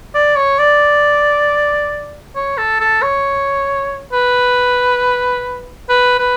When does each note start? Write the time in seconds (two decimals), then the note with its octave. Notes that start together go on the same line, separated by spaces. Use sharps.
0.15 D5
0.36 C#5
0.59 D5
2.36 C#5
2.58 A4
2.80 A4
3.02 C#5
4.13 B4
5.89 B4
6.19 B4